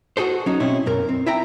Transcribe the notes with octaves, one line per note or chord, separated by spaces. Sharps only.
F#4 G#4 A4 C5
F#3 C#4 D#4
B2 C4 C#4 E4
B1 F#2 A#4
C4
E4 E5 G5 A#5